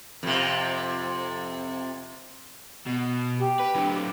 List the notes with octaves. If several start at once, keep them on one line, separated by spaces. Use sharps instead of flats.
F2 C3
B2
G4
B4
D3 F#3
D6